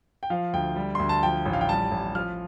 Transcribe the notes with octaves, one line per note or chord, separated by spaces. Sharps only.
G5
F3 F5
D2 G5
G3
D2 C6
A5
F3 G5
A1
F5
G5
G3 A5
A1
F3 F6